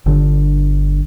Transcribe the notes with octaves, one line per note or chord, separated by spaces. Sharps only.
G1 D3